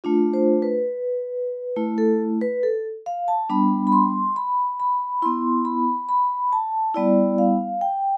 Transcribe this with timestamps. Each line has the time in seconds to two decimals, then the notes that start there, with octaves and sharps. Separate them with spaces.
0.04 A3 D4 F4
0.33 C5
0.62 B4
1.76 A3 E4
1.98 A4
2.41 B4
2.63 A4
3.06 F5
3.28 A5
3.50 G3 B3 D4 B5
3.87 B5
3.92 C6
4.36 B5
4.80 B5
5.22 B3 E4 C6
5.65 B5
6.09 B5
6.53 A5
6.95 G3 B3 E4 D5
7.38 F5
7.81 G5